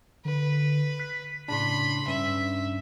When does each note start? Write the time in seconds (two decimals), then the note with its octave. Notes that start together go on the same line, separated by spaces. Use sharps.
0.25 D3 B4
0.99 F#6 B6
1.48 A2 C#3 D4 B5 C6
2.07 G2 C#4 E5